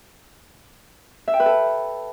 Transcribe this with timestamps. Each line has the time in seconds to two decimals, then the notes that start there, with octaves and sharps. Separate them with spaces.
1.28 E5
1.34 G5
1.40 B4
1.46 A4